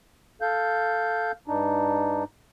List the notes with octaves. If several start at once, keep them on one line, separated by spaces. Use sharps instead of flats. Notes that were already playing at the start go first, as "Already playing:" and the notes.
A4 F5 G6
G2 D4 D#4